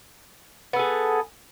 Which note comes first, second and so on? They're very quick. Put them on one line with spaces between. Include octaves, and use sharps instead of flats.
B3 A4 G#4